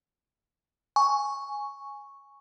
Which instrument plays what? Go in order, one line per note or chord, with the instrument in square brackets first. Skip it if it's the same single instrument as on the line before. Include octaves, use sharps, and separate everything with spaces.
[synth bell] G#5 C#6